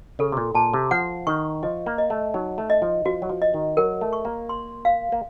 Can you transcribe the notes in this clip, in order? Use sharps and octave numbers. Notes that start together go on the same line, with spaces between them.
C#3 A4
C3
A#2
A#2 A5
C3
F3 F#5
D#3 C#6
F3 D#5
A#3
D#5
A3
F#3 D#4
A3
D#5
F3
F3 F#4
F#3
F3
D#5
D#3
F#3 A#4
A3
C#6
A#3
C6
F5
A#3